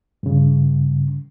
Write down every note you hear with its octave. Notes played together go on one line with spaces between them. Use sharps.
G2 C#3